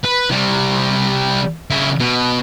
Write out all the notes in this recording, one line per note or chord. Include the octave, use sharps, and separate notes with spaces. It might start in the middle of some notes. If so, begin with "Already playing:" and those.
B4
C3 G3
C#3 E4
B2